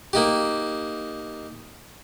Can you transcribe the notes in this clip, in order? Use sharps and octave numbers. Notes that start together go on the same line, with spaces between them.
A#3 D#4 G4